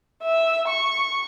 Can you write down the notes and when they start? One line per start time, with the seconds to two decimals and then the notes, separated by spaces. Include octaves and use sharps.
0.23 E5
0.68 C#6